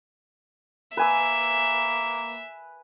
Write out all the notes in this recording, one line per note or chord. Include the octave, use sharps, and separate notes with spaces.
A#3 B4 E5 G#5 E6